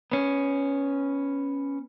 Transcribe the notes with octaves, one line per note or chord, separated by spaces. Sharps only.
B3 C#4